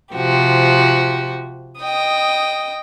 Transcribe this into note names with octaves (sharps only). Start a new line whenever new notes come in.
C3 F3 F#4 G4
D#5 G5 D#6